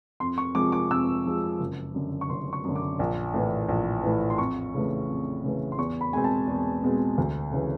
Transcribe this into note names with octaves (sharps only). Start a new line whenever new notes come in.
F2 C6
C#6
C3 F3 G#3 D6
D6
F2 E6
C3 F3 G#3
F#1
F#2 D3
C#6
F#1 C6
C#6
F#2 D3
D6
A#1
A2 E3
A#1
A2 E3
C6
F2 C#6
C#3 E3 A3
F2
C#3 E3 A3
C6
E2 C#6
B5
B2 G#3 C4 G#5
A5
E2
B2 G#3 C4
D2
C#3 E3